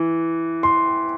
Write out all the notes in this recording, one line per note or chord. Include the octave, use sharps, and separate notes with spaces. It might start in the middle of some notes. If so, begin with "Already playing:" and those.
Already playing: E3
C6